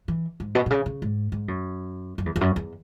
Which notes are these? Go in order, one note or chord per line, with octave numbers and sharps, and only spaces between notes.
E3
G#2
B2
B2
C#3
C#3
G#2
G#2
F#2
F#2
E2
E2
F#2
E2